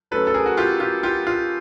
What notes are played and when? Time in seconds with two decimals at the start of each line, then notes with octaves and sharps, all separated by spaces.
0.11 F#3 A3 C#4 A4 B4
0.27 A4
0.34 G#4 A#4
0.46 F#4
0.57 F4 G4
0.80 F4 G4
1.03 F4 G4
1.27 F4